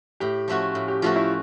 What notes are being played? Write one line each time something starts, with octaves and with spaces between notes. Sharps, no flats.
A2 G4
F3 A3 C#4 F#4
A2
G4
F3 A3 C#4 F4 F#4
E4